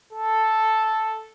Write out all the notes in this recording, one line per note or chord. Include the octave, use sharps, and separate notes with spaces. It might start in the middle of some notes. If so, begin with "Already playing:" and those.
A4